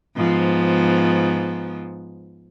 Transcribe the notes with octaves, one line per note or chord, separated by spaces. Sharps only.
G#2 F3 B3